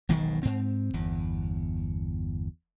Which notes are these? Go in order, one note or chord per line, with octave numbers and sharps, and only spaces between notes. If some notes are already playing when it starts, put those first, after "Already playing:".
E1 B1 G#2 D#3
G#2 C4
G1 E2